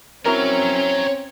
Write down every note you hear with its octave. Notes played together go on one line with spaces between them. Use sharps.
C4 C#4 E4 F#4 A#4 C#5 A#5